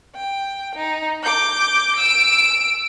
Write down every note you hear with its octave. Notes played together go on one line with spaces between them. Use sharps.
G5
D#4
D6 G6
E6 D7